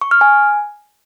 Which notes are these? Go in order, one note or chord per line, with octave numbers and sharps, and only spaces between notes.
C#6
F6
G#5